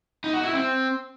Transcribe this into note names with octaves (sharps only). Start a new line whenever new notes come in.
D#4
F#4
E4
C4